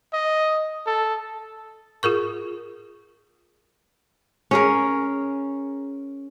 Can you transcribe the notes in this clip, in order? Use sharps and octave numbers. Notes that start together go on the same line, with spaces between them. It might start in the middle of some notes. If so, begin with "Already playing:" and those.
D#5
A4
F4 G#4 A#4 C#6
C#4 G#4 A#4